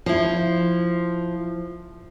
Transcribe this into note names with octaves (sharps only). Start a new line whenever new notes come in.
F3 E4